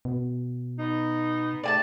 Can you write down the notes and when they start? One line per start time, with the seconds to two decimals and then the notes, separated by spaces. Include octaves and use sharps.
0.05 B2
0.79 B3 D#4
1.64 G#2 C3 A3 D5 G#5 A5